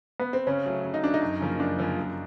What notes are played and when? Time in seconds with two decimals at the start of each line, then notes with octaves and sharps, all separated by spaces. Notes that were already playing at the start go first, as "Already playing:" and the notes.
0.20 B3
0.33 C4
0.47 C#3 C#4
0.66 F#3 A3
0.85 C#3
0.94 D#4
1.03 F#3 A3 D4
1.14 D#4
1.22 F#2
1.41 C#3 F3 A#3
1.60 F#2 D4
1.79 C#3 F3 A#3
1.97 F#2